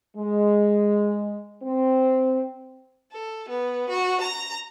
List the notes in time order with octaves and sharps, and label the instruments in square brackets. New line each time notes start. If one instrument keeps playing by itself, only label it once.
[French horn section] G#3
C4
[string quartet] A4
B3
F#4
A#5